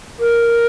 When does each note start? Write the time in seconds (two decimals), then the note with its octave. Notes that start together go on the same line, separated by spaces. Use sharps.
0.20 A#4